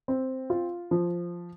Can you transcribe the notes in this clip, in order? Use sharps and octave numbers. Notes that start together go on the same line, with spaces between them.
C4
F4
F3